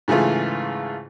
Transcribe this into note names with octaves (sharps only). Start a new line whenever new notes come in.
G#2 C#3 E3 A3 F4